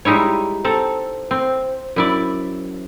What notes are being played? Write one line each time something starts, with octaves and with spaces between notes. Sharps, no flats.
G3 G#3 D#4 E4 C#5
C4 A4 A#5
C4
F#2 E4 D5